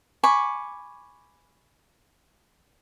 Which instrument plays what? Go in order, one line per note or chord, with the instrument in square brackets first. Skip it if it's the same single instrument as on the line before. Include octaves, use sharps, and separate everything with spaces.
[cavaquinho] G#5 B5 C#6 D6